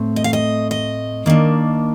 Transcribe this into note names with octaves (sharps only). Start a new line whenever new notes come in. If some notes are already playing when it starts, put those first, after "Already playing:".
Already playing: A2 A3 C4
D#5
F5
D#5
D#5
D#3 A#3 D4